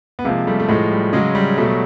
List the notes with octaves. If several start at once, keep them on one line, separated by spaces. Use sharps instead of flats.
B3
C3 F3 G#3 A#3
G3 A3
A3
A2 F3 G#3
G3
C#3 F#3 G#3
G3
B2 F#3 G3 A3